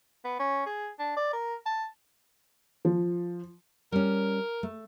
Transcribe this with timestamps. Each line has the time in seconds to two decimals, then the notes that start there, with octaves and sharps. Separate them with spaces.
0.25 B3
0.39 C#4
0.66 G#4
0.99 D4
1.16 D5
1.33 A#4
1.66 A5
2.85 F3
3.92 G3 C#4 A#4
4.63 A3